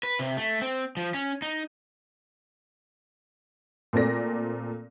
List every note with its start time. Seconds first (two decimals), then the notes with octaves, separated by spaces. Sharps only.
0.03 B4
0.19 C3
0.37 A3
0.61 C4
0.97 F3
1.14 C#4
1.42 D#4
3.93 A#2 A3 C4 D5 A#6